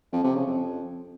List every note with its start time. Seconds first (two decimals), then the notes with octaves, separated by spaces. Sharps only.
0.12 F2
0.24 C3
0.35 C#3
0.47 F2